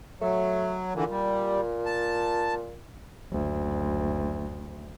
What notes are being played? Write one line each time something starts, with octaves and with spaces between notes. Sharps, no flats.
F#3 A3
A#2 D3 E3
G3
A5
F#1 D2